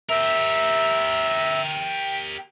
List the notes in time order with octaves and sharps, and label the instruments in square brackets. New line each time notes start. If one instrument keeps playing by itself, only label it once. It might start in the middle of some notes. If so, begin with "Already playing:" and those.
[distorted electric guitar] G4 A#4 [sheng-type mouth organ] E5